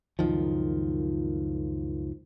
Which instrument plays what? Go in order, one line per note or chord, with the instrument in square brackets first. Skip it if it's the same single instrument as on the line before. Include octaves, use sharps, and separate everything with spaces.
[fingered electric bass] C#2 F#2 D#3 F3